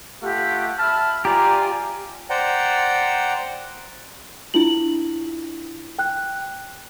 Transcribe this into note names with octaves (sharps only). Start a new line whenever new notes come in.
A3 F4 G4 F#5
E5 A5 B5 F6
F4 G4 D5 G#5 A#5
C5 D5 F#5 G5 A#5
D4 E4 F4 F#7
G5 F#6